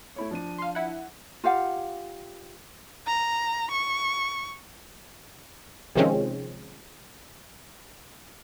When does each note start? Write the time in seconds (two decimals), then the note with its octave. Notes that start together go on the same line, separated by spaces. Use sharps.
0.16 A3 E4 C#5
0.31 F3 D4 D#7
0.58 F5 C6
0.75 E4 F#5
1.44 F4 G4 F5 F#5
3.07 A#5
3.71 C#6
5.95 C3 D#3 F3 G#3 C4 C#4